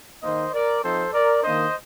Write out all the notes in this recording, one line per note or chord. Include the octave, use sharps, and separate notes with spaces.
D#3 A#3 D#4 C5 D#5
A#4 D5
F3 C4 D#4 A4 C5
A#4 D5
D#3 A#3 D4 C5 D#5